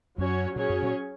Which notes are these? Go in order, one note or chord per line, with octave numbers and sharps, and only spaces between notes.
F#2 F#3 C#4 F#4 C#5
A#2 F#3 C#4 G#4 C#5
F#2
A#2